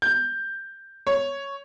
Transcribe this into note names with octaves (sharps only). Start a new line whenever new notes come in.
G6
C#5